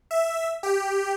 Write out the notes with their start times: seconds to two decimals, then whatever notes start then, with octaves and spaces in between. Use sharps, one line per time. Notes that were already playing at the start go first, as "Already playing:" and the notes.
0.11 E5
0.63 G4